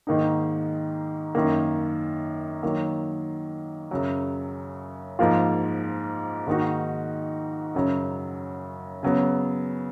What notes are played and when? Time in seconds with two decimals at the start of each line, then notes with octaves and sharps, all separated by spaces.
0.07 G#2 D#3 A#3 D#4
1.35 F#2 D#3 A#3
2.63 D#3 F#3 A#3
3.91 F#2 C#3 F#3
5.19 G#2 F3 A#3 F4
6.47 G#2 D#3 A#3 D#4 F#4
7.75 F#2 C#3 F#3
9.03 C#3 F#3 B3